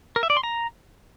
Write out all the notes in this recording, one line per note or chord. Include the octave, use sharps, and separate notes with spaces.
A#4
E5
D5
C6
A#5